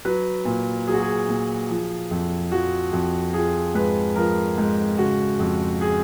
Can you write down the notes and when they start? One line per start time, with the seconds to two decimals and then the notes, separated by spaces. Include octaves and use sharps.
0.05 F#3 B4
0.45 A#2
0.87 F#3 G#4
0.94 F#4
1.02 G#4
1.29 A#2
1.69 F3
2.11 F2
2.51 F3 F#4
2.92 F2
3.33 F3 G#4
3.74 G#2 B4
4.16 F3 A#4
4.58 G#2
4.98 C#3 F#4
5.39 F2
5.81 G#4